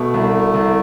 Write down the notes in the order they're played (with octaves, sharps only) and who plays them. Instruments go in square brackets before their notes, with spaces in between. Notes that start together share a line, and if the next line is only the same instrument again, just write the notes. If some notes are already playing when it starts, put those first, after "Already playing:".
Already playing: [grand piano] B2 [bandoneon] A3
[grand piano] C2
C2